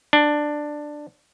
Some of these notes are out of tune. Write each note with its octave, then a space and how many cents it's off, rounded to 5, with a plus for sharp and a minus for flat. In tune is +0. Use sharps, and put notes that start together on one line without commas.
D4 +10